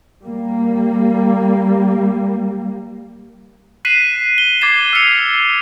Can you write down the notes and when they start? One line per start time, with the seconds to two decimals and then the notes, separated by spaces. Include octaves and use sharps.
0.24 G3 A#3
3.85 F#6 B6 C7 D#7 E7 F#7
4.38 G7
4.61 D6 G#6 A6 C7 E7
4.93 E6 F6 B6 C#7 F7